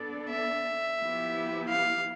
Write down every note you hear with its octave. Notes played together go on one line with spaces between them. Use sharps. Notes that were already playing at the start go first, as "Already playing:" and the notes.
Already playing: B3 D4 A4 D5
E5
F3 B3 E4 G4
F5